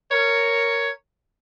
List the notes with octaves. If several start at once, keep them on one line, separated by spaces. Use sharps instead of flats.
A#4 C#5